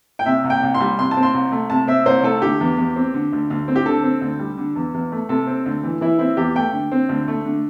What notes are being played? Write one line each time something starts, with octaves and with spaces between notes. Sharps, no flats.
G5
C3 E5
C2
G5
C2
C6
G3
C3 C6
A5
C4
C6
C2
A3
C3 A5
C4 E5
C2 C5
A3 A4
D3 G4
E2
E2
C4
D3
D2
D2
C4
G4
D3 A4
C4
D2
G3
D3
E2
E2
A3
C3 A4
C4
D2
E3
E3 E4
C4 E4
E2 G4
A3 G5
D3
C4
D2
A3
D3